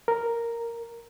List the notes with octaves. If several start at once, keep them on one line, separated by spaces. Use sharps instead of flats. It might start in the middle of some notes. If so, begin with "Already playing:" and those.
A#4